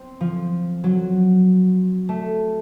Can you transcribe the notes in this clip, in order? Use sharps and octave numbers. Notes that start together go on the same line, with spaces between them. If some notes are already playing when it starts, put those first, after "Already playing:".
Already playing: C4
F3
F#3
A3